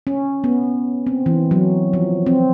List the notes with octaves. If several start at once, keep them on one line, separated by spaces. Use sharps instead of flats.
C#4
B3
C4
E3
F#3
F3
C4